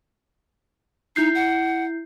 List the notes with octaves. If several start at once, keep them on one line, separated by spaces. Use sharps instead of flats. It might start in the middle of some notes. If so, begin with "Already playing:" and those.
D#4 E4 G6 C7
F#5